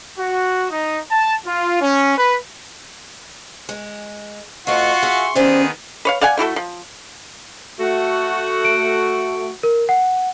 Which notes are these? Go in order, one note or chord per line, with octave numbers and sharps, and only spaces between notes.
F#4
D#4
A5
F4
C#4
B4
G#3
F2 A3 F4 F#4 C6 C#6
G#4 E5 F5
D#3 B3 C#4 G4 G#4 C5 D5
B4 C#5 F5
D5 F5 F#5 G#5
A3 E4 F#4 A4
F3
A3 F#4
D7
A#4
F#5